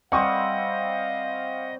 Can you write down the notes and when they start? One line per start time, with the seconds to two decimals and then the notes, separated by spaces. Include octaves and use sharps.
0.12 G3 C4 D#5 F5 F#5 C#6 D#6